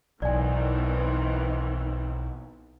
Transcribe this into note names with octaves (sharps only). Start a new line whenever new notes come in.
B1 D#3 E3 C4 D5 G#5